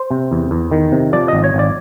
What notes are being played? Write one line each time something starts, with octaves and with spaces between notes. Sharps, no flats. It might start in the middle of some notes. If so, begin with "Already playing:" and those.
Already playing: C5
C3
E2
E2
D#3
C3
F3 D5
G#1 D#5
C#5
G#1 D5